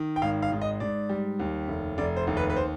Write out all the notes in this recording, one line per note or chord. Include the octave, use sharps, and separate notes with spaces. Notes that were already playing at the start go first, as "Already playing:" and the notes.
Already playing: D#3
G5
G#1 F5
F5
G#2
D#5
G#2 D5
G3
D#2
F1
F1 D5
C5
D#2
B4
B4
C5